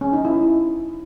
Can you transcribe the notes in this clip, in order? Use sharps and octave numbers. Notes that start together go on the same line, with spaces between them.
C#4
D#4
E4